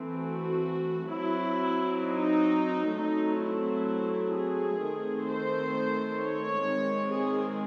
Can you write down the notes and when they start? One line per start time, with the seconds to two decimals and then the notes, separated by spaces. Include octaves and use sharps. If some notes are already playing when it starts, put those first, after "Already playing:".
Already playing: E3 A3 C4
0.17 F#4
1.10 F#3 C4 E4
2.02 D#4
2.95 F#3 A3 C4 D#4
3.41 E4
4.34 G#4
4.80 D#3 A3 C4
5.27 C5
6.19 C#5
6.65 D#3 G#3 C4
7.11 G#4